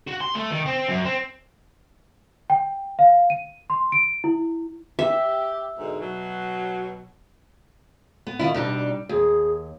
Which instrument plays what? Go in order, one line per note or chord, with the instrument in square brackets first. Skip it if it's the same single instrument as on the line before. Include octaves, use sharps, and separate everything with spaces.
[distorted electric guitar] F#4
C6
A3
D#3
C4
F#2
C4
[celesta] G5
F5
D#7
C6
D7
E4
[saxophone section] G4 [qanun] E5
[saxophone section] G#2 B2 D3
B2 F#3
[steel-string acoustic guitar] B3
[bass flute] D#3 [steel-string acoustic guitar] E4 F4
[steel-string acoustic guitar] B2 D4 D#4 [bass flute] G3
[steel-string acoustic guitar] D#2 [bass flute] G#4